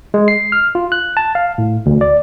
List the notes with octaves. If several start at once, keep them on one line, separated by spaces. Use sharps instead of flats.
G#3
C7
F6
F4
F#6
A5
F5
A2
D2
D5